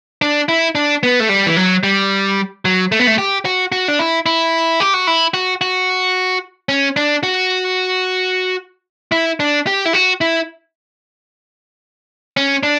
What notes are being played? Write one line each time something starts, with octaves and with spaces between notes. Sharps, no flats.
D4
E4
D4
B3
A3
G3
E3
F#3
G3
F#3
A3
B3
A3
G4
F#4
F#4
D4
E4
E4
G4
F#4
E4
F#4
F#4
C#4
D4
F#4
E4
D4
G4
E4
F#4
E4
C#4
D4